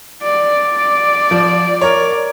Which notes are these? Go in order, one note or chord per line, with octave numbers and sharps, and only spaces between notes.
D5
F3
A#4 C#5